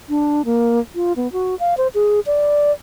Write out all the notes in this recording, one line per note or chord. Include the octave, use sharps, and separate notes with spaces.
D4
A#3
F4
B3
F#4
F5
C5
G#4
D5